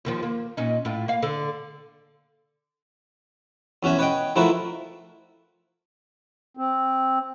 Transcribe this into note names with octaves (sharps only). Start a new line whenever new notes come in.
D#2 D#3 F3
A#3
A#2 C#4 D#4
A2 F4
A#3 F5
D3 A4
E2 C#4 F#4 E5 G#5
B4 C#5 D#5 F#5 G5
F3 A3 E4 F#4 A#4 B4
C4